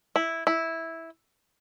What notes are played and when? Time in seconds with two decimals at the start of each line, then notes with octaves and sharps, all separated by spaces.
0.16 E4
0.47 E4